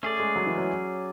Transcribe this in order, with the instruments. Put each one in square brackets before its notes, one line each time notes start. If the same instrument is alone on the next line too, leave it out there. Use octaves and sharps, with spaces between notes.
[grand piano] A3 [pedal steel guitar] C#4 G#4 D5
[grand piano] G#3
F#3
E3
F#3